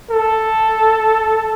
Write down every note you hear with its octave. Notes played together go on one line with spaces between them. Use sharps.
A4